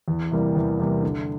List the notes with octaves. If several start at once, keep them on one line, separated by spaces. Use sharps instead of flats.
E2
C3 E3 G3 A#3
E2
C3 E3 G3 A#3
D3